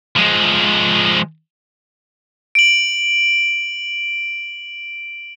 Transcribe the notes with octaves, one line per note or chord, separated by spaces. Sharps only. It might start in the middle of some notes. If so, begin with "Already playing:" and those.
F3 G#3
D7 F#7